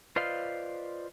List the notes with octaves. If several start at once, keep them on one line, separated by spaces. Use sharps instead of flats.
F4 B4 C5 D5 D#5 F5